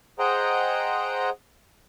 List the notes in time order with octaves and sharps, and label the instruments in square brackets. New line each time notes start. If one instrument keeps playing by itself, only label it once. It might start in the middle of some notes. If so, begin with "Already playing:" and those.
[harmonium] G#4 C5 D#5 F#5 G5 A#5